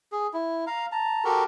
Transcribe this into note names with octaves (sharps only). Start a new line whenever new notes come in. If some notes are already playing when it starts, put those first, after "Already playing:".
G#4
E4
F5 A#5
A5 A#5
F#4 G4 A4 A#4